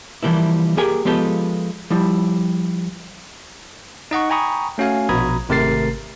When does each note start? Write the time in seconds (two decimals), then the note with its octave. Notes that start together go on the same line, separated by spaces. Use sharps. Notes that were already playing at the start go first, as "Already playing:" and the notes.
0.23 E3 F3 G3 A#3 E4
0.77 A#3 G4 G#4 A#4 G5 G#5
1.05 F3 G#3 B3 F4 G4 A4
1.90 F3 G3 E4
4.11 D#4 D#5 F#5 C#6
4.30 G5 G#5 A#5 B5 C#6 D#6
4.78 A3 C#4 F#4 F5 G#5
5.09 A#1 B2 A#5 B5 D#6 G#6
5.49 G#1 C3 A3 A#4 A6 C7